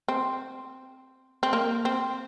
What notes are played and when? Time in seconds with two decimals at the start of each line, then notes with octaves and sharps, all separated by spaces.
0.08 C4
1.43 C4
1.53 A#3
1.85 C4